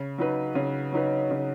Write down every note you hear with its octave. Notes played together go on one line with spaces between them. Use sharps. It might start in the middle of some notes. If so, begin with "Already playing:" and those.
Already playing: C#3
F#3 D#4 B4
C#3
F#3 D#4 B4
C#3